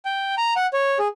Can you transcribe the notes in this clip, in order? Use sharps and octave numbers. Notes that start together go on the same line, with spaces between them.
G5
A#5
F#5
C#5
G#4